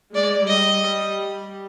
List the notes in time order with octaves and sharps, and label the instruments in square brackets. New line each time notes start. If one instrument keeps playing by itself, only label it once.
[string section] G#3 [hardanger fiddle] D5
[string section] G3 [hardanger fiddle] D#5